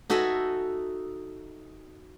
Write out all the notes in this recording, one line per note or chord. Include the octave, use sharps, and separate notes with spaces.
D#4 F#4 A4 E5 G#5